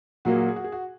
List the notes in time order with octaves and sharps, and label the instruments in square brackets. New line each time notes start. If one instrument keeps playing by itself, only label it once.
[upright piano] A#2 F#3 A#3 [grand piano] F#4
[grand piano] G#4
F#4
G#4
F#4
G#4
F#4